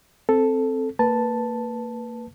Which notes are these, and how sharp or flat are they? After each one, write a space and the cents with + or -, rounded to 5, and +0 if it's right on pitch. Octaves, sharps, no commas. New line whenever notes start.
C4 +0 A4 +0
A#3 -30 B4 -10 A5 +0